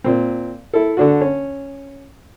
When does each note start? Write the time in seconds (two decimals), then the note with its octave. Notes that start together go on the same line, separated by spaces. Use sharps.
0.04 A#2 C4
0.73 E4 A4
0.97 D3 D4 F#4
1.21 C#4